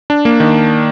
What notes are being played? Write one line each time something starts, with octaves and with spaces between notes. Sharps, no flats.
D4
A#3
D#3